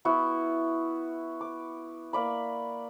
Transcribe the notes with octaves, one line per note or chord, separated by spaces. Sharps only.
B3 E4 F#4
D6
A#3 D5 B5